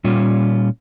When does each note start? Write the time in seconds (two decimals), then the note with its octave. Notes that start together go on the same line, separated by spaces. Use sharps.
0.04 A#2 G3 C#4 F4